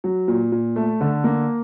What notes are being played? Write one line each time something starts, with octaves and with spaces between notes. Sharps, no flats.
F#3
A#2
A#2
A3
D3
A#3